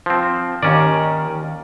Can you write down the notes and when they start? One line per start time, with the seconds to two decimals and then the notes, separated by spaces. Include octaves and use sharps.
0.06 F3 C4
0.63 D#2 D#3 C#4 D5